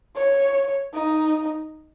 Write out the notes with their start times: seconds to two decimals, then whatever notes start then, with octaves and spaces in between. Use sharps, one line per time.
0.16 C#5
0.93 D#4